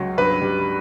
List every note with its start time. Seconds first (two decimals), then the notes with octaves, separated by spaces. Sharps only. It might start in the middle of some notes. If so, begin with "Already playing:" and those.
Already playing: C#2 F#3
0.18 G2 B4
0.42 G3